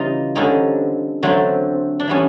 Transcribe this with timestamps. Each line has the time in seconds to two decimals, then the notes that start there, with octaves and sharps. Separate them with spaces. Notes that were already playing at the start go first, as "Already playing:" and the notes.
Already playing: C#3 E3 G3 D#4 F4 G4
0.35 D3 G3 C4 C#4 D#4
1.23 D3 F#3 A3 C4
2.00 D4
2.08 E3 G3 B3 C#4